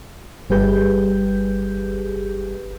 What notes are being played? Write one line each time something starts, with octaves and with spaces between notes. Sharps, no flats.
G1 G3 G4 G#4 B4 G6